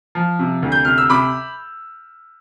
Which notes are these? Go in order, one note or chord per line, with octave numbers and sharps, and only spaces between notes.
F3
C3
D2
G6
C3 F6
E6
C3 B5 D6